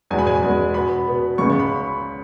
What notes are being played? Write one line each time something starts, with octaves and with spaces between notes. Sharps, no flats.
E2 B2 G#3 B3 G#5
B5
G#5
E2 B2 G#3 B3
B2 B3 B5
B2 B3
C#2 C#3 G#3 B3 C#6
C#6
B5